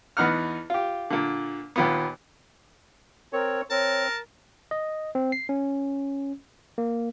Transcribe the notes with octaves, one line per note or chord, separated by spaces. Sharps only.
E2 B3 D#4 F#5 F6
F4 G4
A#2 D3
D#2 A#2 B3
C4 A#4 C#5
C4 A#4 C#5 A5
D#5
C4
C7
C#4
A#3